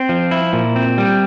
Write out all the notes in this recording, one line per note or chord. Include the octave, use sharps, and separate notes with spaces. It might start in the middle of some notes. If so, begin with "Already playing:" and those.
Already playing: C4
F3
E4
A#2
C4
G3